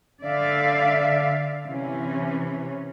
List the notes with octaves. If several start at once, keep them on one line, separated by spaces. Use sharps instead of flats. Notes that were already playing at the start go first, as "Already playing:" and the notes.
D3 D5 E5 F5
C3 E3 C#4